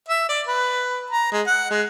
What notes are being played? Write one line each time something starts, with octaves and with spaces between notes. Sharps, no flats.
E5
D5
B4
A#5
G#3
F#5
G#3